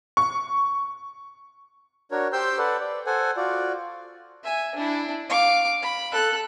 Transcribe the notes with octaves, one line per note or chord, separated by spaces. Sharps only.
C#6
D4 F#4 A#4 C#5
G4 C5 G5 C6 E6 G6
A4 B4 D5 F#5
D5
A4 C5 F#5 G#5
F4 F#4 D5
E5 G#5
D4 E4
F5 D6
B5
A4 F#6